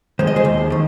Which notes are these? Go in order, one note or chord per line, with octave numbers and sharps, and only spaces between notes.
D#3 G#3 C5
D#5
G#4 C5
D#2
D#3